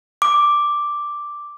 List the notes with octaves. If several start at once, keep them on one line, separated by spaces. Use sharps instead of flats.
D6